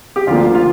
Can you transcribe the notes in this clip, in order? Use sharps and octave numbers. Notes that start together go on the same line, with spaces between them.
G4
D2 D3 F3 A#3 F4
F4